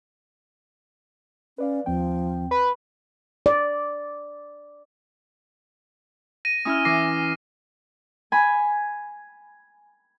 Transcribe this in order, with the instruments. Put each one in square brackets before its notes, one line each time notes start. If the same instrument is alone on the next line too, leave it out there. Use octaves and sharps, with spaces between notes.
[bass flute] C#4 [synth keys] B4 D5 F5
[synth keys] D#2 C4 G5 [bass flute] F3
[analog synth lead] B4
[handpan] D5
[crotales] A#6 D#7
[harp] C#4 E4 [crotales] D#6 F6
[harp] E3 [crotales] D6 A#6 C7
[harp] G#5 B5